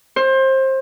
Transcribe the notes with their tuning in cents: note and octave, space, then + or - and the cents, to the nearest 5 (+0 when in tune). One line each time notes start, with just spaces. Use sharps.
C5 +25